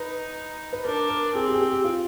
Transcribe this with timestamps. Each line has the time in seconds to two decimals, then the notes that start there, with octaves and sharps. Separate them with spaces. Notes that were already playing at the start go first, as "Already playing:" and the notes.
Already playing: D#4 B4
0.73 B4
0.85 D4 A#4
1.09 A#4
1.34 C4 G#4
1.48 G4
1.54 G#4
1.60 G4
1.72 G4
1.84 F4